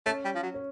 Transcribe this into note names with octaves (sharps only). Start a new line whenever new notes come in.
A3 C#4
G3
F3
F#3
C#4